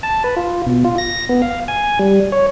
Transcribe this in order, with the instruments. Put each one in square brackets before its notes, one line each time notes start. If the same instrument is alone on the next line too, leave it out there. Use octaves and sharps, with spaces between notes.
[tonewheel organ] A5
B4
F4
B2
F4
A#6
B3
F5
G#5
G3
C#5